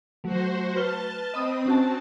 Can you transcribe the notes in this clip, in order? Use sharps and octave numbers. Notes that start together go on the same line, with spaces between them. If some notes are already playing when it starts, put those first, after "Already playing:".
F#3 A3 F#4 C5
B4 A5 F6 G7
C4 D#5 B5 D#6
C#4 F#4 A5